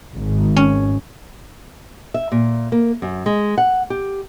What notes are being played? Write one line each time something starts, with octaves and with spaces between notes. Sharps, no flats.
G#1
C#4
E5
A#2
A#3
F#2
G#3
F#5
G4